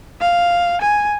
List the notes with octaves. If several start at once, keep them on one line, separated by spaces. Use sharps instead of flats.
F5
G#5